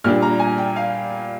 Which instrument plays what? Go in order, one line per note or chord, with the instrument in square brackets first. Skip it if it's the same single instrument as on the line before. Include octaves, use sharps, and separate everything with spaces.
[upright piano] A#2 G3 D4 F6
A#5
G#5
G5
F5